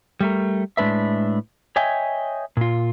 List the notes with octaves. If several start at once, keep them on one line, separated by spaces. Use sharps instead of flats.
G3 A3 A#4
A2 G#3 D4 B4 E5
C#5 D#5 E5 G5 G#5
A#2 F4